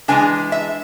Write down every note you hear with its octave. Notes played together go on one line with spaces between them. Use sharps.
E3 G#3 B3 D4 G#5
E5